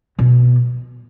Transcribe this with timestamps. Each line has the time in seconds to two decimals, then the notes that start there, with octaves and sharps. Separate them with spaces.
0.19 B2